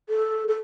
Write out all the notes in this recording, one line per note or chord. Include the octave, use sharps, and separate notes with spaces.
A4
A4